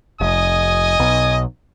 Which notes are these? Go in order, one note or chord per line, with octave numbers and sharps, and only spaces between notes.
F1 D#5 G#5 D#6
B1